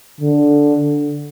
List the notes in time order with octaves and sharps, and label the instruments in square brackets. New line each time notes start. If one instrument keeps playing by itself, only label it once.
[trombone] D3